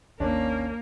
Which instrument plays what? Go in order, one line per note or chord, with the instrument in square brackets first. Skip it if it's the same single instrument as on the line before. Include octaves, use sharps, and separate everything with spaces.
[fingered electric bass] G#1 D#2 [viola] A#3 [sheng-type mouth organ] C#4 [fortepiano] D4